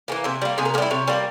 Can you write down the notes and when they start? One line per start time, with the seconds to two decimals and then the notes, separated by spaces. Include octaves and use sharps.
0.08 E3 G3 A#3
0.24 C3 E5
0.42 G3 A#3
0.58 C3 G#4
0.65 A#4
0.74 A#3 G#4
0.78 G3 E4
0.91 C3 C#5
1.08 G3 A#3